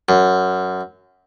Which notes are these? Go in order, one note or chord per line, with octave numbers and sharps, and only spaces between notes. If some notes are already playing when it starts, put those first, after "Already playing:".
F#2